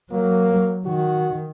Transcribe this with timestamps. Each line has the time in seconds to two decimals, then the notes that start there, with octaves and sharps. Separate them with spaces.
0.12 F#3 A#3
0.86 D#3 F#4